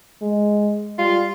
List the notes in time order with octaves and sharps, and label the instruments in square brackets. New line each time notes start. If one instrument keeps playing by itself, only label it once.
[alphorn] G#3
[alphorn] G3 [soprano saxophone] F4